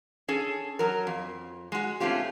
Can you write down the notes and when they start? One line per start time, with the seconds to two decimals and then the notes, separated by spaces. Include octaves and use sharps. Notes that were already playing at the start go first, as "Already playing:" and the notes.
0.28 C#4 G#4 A4
0.79 F#3 A#4
1.07 F2
1.72 G#3 F#4
2.00 A3 C4 C#4 F4 G4